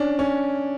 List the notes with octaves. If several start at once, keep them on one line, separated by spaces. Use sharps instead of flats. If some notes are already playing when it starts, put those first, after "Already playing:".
Already playing: C#4 D4
C#4